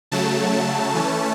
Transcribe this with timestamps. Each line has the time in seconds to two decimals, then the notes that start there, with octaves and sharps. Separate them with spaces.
0.12 C#3 F#3 A3 A5
0.95 E3 A3 C#4